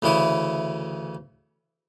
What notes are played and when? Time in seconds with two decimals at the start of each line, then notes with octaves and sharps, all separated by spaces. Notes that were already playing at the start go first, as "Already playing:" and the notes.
0.02 D2 C#3 E3 E4 D#6